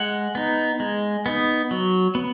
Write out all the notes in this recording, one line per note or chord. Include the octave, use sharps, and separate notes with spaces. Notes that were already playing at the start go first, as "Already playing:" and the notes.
Already playing: G#3 F#5
B3 D#4
G#3
B3 D#4
F#3
B3